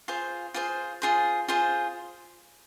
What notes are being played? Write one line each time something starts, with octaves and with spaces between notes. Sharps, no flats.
F4 G#4 C5
F4 G#4 C5
F4 G#4 C5
F4 G#4 C5